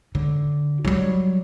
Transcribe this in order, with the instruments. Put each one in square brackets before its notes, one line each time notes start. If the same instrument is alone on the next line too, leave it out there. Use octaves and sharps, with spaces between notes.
[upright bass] D3
F#3 G3